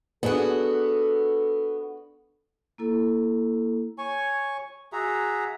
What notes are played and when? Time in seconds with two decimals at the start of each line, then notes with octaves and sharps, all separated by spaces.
0.23 B3 D4 F#4 G#4 A4
2.78 A#3 E4 A4
3.98 C#5 G#5 C#6
4.92 F#4 G#4 E5 A#5